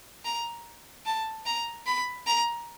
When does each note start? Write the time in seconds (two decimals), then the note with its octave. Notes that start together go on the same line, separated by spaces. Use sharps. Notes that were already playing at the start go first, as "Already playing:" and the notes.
0.25 A#5
1.06 A5
1.46 A#5
1.86 B5
2.27 A#5